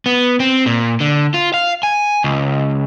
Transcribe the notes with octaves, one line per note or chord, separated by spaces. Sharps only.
B3
C4
A#2
D3
F4
F5
G#5
C#2